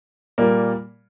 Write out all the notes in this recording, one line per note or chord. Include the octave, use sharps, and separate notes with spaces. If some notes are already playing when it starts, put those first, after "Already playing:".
A#2 G3 A#3